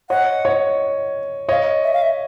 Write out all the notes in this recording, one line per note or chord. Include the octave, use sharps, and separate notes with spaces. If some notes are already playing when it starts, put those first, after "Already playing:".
C#5 D#5 F#5
C#5 D#5
C#5 D#5 F5
E5
F5
E5